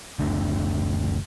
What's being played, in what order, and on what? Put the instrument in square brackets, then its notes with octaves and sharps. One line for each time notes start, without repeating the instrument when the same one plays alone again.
[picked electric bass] F#1 D2 D3